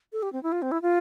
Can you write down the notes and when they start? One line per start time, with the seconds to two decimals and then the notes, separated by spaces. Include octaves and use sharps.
0.13 A4
0.23 G4
0.33 C4
0.43 E4
0.52 F4
0.62 C4
0.72 E4
0.82 F4